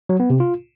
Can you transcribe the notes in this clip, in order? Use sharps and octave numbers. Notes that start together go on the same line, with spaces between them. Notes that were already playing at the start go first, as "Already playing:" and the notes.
F#3
B3
C3
F4